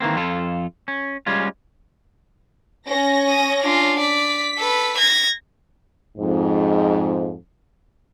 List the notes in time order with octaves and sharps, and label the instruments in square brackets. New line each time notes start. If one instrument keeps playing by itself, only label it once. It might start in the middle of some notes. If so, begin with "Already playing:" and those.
[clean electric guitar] D#3 E3 A#3 C4
F2 F4 A4
C#4
G3 G#3 C#4 F4
[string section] C#4 A#6
[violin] D#6
D4 F4
[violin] D5 [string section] B6
[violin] A4 B4
G#6 A#6
[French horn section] F2 G#2